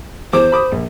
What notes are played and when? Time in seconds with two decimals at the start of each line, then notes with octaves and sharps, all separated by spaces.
0.33 E2 E3 C5 D6
0.52 B5 D6 D#6
0.72 A#1